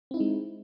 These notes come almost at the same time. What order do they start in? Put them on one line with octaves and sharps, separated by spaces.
C4 E4 D#4 G#3